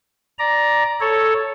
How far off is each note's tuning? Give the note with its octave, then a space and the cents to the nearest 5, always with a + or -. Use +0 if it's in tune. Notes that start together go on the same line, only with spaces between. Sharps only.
D5 +0 A#5 +10
A4 +0 C#5 +0